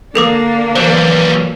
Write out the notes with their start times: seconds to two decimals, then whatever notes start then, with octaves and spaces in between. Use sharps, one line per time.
0.15 D3 A#3 D4 A4 A#4 D6
0.76 E3 F#3 G3 C5